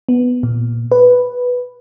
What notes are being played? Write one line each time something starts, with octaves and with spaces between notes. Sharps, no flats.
B3
A#2
B4